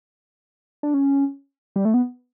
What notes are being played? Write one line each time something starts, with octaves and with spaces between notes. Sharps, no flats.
D4
C#4
G3
A3
B3